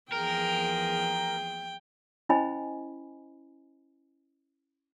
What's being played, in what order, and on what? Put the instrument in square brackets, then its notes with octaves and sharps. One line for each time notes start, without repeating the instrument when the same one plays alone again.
[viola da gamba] E2 F3 G#4 [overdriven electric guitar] A#4 [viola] G5
[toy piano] C#4 E4 C5 D#5 G#5 B5